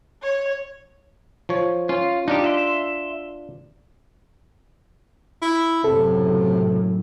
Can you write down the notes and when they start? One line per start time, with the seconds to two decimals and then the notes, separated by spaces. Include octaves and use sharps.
0.22 C#5
1.49 F3 C#5
1.89 C#4 F4
2.28 D4 D#4 F4 G4
2.44 E5 C6
5.42 E4
5.84 F#1 A2 C3 A4